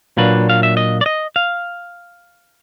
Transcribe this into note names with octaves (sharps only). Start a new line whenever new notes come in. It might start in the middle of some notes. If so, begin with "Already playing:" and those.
A#2 F#3 A#3 D4 B4
F5
E5
D#5
D5
D#5
F5